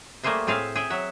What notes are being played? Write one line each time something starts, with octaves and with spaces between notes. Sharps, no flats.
G3 A3 A#3 G#4 C5 E5
A2 C4 G#4 E5 F5
G#4 E5 G5
F#3 E5 F#5